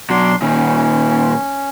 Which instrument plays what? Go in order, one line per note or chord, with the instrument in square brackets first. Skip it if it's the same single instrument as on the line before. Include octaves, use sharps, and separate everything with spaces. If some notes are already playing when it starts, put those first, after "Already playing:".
[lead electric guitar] B2 F#3 [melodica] D4 C6
[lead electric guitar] A#2 D#3 [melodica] C#4